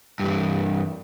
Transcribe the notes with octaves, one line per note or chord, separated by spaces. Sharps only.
G2 E3